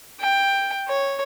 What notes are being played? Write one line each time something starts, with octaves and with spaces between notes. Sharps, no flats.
G5
C#5